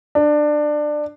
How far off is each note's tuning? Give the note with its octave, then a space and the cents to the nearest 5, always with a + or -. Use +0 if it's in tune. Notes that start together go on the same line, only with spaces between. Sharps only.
D4 +20